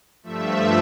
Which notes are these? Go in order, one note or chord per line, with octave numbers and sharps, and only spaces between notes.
G2 F3 A3 E5